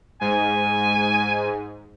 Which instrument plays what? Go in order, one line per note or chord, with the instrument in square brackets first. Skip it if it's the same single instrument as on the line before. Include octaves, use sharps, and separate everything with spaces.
[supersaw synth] G#2 [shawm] G#5